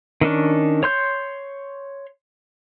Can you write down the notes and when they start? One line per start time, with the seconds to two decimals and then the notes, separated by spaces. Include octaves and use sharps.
0.21 D#3 C#4 D4
0.83 C#5 C6 G6